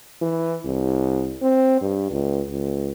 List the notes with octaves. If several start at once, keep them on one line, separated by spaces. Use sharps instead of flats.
E3
C2
C4
G2
C#2
C#2